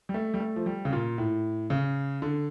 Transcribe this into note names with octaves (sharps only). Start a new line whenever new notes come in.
G3
A3
G3
A3
F3
G3
C#3
A#2
A2
C#3
D3